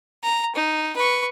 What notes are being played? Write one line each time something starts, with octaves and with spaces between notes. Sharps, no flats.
A#5
D#4
B4 C#6